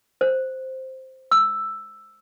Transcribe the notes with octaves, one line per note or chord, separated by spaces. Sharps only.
C5
E6